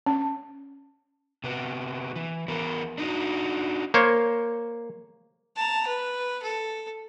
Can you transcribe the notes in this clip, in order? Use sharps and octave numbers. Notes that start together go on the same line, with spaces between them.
C#4
C3 B3
E3
E3 B3 A#4
D4 D#4 F#4
A#3 C5 C#5
A5 A#5
B4
A4